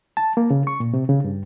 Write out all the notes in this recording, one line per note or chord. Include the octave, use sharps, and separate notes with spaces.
A5
A#3
C#3
C#6
A#2
C3
C#3
G2